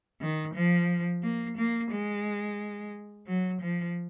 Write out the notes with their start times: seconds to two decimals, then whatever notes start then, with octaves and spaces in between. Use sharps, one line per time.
0.21 D#3
0.55 F3
1.23 A#3
1.57 A#3
1.91 G#3
3.27 F#3
3.61 F3